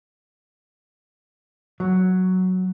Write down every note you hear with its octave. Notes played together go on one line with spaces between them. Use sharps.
F#3